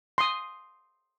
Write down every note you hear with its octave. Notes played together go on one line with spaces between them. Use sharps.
C6 D#6